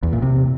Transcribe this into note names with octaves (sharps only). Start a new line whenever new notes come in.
E2
A#2
C3